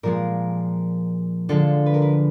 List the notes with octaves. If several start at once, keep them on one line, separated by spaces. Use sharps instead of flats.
A#2 F3 G#3 A#4
D3 F3 G#3 A4
B4
A#4
B4